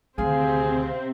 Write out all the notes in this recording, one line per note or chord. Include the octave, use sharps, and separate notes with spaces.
D2 C3 D#3 C4 G#4 F5